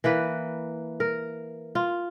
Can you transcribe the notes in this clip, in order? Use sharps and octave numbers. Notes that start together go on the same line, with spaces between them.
E3 A#3 B4
A#4
F4